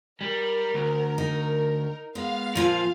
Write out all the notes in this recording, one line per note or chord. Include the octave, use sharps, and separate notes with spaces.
G3 A#4
D2
D#4
G#3 B3 F5
A#2 F3 F4 G#5